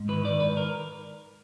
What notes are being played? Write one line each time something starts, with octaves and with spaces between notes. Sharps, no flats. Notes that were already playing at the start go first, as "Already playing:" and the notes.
Already playing: G#2
D#3 B4
D#3 D5
G#2 B4
A#4